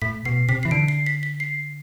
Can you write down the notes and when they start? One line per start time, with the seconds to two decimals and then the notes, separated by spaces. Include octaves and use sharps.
0.02 A2 B6
0.25 B2 C7
0.49 C3 B6
0.63 E3 C7
0.71 D3 D7
0.88 C7
1.06 B6
1.23 B6
1.40 C7